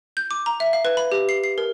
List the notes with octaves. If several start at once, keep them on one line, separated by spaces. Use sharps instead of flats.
G6
D6
A#5
E5
F5
B4
B5
G4
C7
C7
A#4